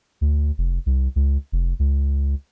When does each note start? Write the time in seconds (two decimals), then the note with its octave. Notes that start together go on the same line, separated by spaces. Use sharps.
0.21 D2
0.58 F1
0.86 C2
1.16 C#2
1.52 F1
1.79 C#2